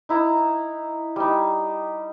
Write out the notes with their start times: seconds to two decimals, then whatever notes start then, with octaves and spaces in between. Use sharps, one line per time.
0.09 D#4 E4 A#5
1.16 G3 D#4